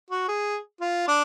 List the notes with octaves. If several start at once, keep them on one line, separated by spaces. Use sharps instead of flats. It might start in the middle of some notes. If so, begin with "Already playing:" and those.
F#4
G#4
F4
D4